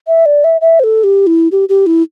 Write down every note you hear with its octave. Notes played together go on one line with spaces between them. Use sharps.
E5
D5
E5
E5
C5
A4
G4
E4
G4
G4
E4